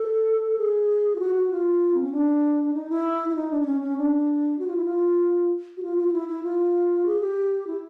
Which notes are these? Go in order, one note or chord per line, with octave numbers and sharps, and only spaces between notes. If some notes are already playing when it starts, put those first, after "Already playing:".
Already playing: A4
G#4
F4
F#4
F#4
F4
C4
C#4
D4
D#4
E4
E4
D#4
D4
D4
C#4
C#4
D4
F#4
F4
E4
F4
F#4
F4
F4
F4
E4
E4
F4
G#4
G4
E4